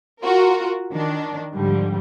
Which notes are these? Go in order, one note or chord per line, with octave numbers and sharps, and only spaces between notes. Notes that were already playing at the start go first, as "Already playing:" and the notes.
F4 F#4 A#4
D#3 D4
G#2 D3 F3 G3